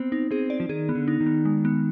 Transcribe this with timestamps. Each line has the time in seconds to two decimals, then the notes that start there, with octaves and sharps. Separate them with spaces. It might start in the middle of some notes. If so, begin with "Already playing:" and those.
Already playing: B3 C4
0.12 D#4
0.31 C4 G#4
0.50 D5
0.60 F3
0.69 D#3 G#4
0.89 B3
0.95 D3
1.08 D#4
1.20 D#3
1.26 B3
1.45 G#3
1.65 B3